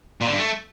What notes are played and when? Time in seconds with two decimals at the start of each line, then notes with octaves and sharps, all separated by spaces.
0.22 A#2
0.27 D3
0.33 G2
0.39 A3